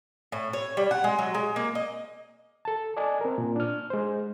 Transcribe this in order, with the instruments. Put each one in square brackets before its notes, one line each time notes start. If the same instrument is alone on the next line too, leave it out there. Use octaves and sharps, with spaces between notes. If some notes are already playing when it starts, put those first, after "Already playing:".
[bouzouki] A2
C#5
G3
F#5
G#3
F#3
G#3
A#3
D#5
[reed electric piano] A4 A5
D5 D#5 G#5 A5
C4 A#4
A#2
D4 F6
G#3 C5